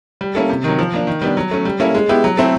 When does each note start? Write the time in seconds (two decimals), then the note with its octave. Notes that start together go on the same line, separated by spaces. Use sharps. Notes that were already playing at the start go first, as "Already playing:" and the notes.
0.21 G3
0.35 A#3 C#4 E4 A4
0.49 C3
0.64 D#3 F#3
0.79 F3
0.93 A#3 D4
1.07 D#3
1.22 G3 B3 D4
1.37 F#3
1.51 A3 C#4
1.65 G3
1.80 A#3 C#4 E4 A4
1.95 G#3
2.09 B3 E4 G4
2.24 F#3
2.37 A3 C4 E4 A4